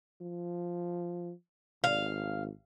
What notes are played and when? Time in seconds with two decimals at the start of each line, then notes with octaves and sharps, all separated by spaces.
0.21 F3
1.84 G#1 F5